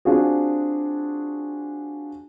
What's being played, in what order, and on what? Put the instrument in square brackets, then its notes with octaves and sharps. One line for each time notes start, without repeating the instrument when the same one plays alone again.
[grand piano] C4 D4 F4 F#4 G#4